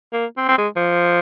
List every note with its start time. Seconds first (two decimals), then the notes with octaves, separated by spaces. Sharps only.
0.13 A#3
0.37 C4
0.49 C4
0.58 G#3
0.76 F3